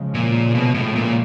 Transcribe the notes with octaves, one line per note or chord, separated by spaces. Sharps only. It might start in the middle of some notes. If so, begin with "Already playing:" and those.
Already playing: C#3 F3 G#3
A#2
B2
A2
A#2